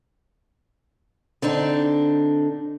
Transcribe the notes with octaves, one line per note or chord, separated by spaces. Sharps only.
D3 C4 D4 D#4